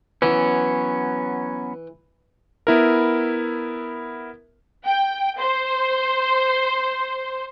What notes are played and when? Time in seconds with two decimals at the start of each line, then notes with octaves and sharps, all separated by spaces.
0.22 E3 F#3 B3 C#4
2.67 B3 E4 A#4
4.85 G5
5.40 C5